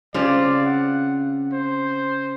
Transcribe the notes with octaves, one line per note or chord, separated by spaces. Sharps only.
C#3 C4 F4 D5
F#5
C5